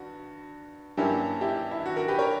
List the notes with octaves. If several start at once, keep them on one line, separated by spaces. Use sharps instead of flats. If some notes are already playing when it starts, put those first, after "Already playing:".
Already playing: G2 F#4
G2 F#3 A#3 C#4 E4 G4
E4 G4
E4
F#4
F#4 A#4
G4 B4
A#4 C#5